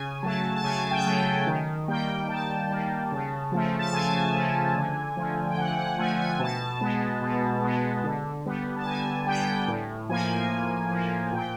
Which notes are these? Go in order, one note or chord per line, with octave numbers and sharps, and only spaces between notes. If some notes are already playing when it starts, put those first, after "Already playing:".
Already playing: C#3 G#5
F#3 A3 A5
A5
C#3 G#5
G5
F#3 A3
D#3
G3 A#3 G5
D#3 A5
G3 A#3
C#3
F3 A3
A5
C#3 G#5
F3 A3
D3
F3 A3
G5
D3 F#5
F#5
F3 A3 G#5
G#5
B2 A5
G#3 B3
B2
G#3 B3
D3
G3 B3
A5
D3 G#5
G3 B3 G5
A2
F3 A#3 G#5
A2
F3 A#3
A#2 G5